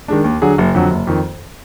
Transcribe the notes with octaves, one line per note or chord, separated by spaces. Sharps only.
D#3 G#3 D4
D#2
D3 F#3 D4 G#4
F#1
F2 D3 F#3
F#1
F2 D#3